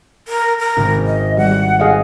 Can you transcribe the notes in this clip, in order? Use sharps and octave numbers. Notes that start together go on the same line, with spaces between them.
A#4
A#4
G#1
D#5
G3 F#5
G#4 D#5 F5